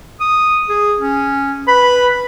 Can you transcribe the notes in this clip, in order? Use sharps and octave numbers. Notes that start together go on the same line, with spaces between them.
D#6
G#4
C#4
B4 B5